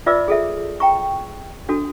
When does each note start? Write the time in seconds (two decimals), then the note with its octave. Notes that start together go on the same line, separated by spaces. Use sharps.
0.06 F4 B4 D5 E5 D6 E6
0.28 G#4 A4 E5
0.80 G5 A#5 C#6
1.69 D4 F#4 A4